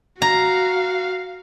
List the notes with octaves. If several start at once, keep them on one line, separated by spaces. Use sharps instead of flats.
F#4 F5 A#5